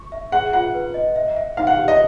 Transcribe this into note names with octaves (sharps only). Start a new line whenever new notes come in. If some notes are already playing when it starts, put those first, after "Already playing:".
Already playing: C#6
E5
G#4 F#5
F4 F#5
B4
D#5
E5
E5
D#4 F5
F#5
G4
D#5